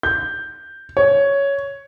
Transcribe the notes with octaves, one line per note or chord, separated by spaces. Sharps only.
G6
C#5